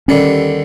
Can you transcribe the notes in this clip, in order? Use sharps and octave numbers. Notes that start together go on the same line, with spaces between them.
D#2 D3 G3 C#4